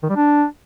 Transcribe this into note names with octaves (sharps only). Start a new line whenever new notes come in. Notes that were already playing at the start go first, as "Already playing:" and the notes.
D#3
G3
D4